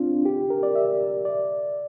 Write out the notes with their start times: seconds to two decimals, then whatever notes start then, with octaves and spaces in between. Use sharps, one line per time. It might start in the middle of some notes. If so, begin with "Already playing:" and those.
Already playing: C4 D4 F4
0.25 G4
0.50 A#4
0.63 D5
0.75 E5
1.25 D5